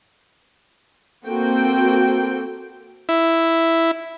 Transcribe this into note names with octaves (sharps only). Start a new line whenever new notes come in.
A#3 C4 F#4 A4 G5
E4